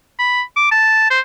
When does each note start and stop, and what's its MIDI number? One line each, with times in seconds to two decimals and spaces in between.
0.19 0.42 83
0.56 0.67 86
0.71 1.05 81
1.10 1.20 72